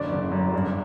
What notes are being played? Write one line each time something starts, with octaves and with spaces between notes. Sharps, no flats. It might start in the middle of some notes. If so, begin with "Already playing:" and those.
Already playing: F#1 D3 D5
F#1
F#2
G2